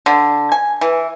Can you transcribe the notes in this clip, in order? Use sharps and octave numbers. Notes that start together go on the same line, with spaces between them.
D3
G#5
E3